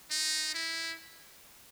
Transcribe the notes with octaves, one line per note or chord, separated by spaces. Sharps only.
D#4
E4